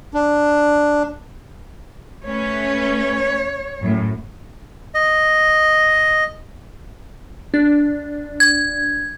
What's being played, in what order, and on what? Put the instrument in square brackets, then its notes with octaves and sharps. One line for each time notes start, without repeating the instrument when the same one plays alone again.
[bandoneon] D4
[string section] A3 C#4 B4 [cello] C#5
[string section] F#2 A2
[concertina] D#5
[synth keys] D4
[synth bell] G#6